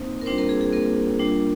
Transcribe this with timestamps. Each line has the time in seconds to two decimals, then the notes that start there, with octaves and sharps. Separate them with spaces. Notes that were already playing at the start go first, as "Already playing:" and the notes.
Already playing: A#3 C4 D#4 C5
0.21 A#4
0.26 G3 C4 D4 F4 C5
0.38 A#3 A#4
0.49 G#4
0.61 G#4
0.73 A#3 A#4
1.19 G3 D4 F4